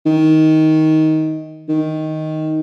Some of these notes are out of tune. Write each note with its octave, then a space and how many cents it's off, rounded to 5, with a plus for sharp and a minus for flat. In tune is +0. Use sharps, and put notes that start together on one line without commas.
D#3 +15
D#3 +5